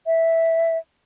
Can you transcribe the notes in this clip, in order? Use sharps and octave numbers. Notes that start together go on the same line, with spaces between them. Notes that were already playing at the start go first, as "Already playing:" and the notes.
E5